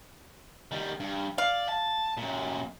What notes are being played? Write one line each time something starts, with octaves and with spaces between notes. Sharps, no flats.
D#3 G3
G2
D5 F5
A5
F#2 A#2